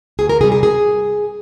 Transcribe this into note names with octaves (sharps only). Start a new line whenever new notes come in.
D2 G#4
A#4
C3 G3 G#4
G#4
G#4